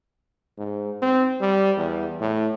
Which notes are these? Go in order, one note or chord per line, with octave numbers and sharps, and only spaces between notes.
G#2
C4
G3
E2
A2